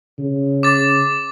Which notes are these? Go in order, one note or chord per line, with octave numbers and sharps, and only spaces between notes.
C#3
D6 A6